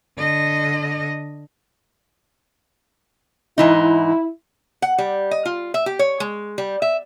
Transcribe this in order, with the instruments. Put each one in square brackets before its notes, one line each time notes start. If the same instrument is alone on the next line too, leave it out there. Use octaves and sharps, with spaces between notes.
[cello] D3 D#5
[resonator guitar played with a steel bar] G#2 E3 D#4 [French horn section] E4
[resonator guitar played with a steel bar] F#5
G3
D#5
F4
E5
G4
C#5
G#3
G3
E5